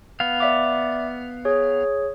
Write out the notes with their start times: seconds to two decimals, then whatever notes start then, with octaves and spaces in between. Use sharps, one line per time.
0.20 B3 F5
0.40 D5 E5 D6
1.45 G#4 C#5